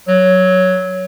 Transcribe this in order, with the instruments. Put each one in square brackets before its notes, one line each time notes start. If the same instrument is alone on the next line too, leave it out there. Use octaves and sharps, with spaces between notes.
[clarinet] F#3